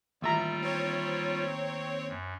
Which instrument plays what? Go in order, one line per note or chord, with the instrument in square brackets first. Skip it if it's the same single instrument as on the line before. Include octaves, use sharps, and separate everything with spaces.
[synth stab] A1 E5 A#5 [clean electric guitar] D#2 [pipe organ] G3 F4
[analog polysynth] C4 C#5
[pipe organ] F#2